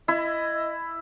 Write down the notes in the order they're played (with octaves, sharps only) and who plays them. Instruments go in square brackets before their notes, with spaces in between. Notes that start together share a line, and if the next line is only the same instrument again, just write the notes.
[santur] E4 [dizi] D#5